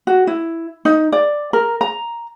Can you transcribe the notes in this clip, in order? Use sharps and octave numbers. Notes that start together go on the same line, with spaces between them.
F#4
E4
D#4
D5
A#4
A#5